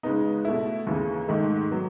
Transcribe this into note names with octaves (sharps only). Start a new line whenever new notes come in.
C#3 G#3 B3 D#4
B2 A3 E4
D#2 C#3 E3 B3
G#2 D#3 A3 D#4
F#3 B3